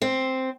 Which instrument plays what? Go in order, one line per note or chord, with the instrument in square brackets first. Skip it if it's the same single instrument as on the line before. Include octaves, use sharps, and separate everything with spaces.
[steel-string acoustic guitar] C4